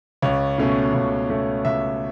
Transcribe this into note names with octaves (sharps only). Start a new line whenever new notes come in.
C#2 C#5
B2 A3 C#4
C#2
B2 A3 C#4
C#2 E5